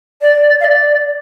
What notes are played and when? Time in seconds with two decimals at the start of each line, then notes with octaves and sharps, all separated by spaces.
0.22 D5
0.60 F5
0.65 D5